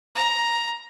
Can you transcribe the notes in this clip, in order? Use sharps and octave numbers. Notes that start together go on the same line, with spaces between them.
A#5